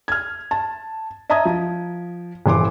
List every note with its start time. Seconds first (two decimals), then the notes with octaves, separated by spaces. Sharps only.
0.08 F6 G#6
0.51 A5
1.30 D#5 E5 A5 A#5 D#6 G#6
1.45 F3
2.46 D#1 E3 C6 D6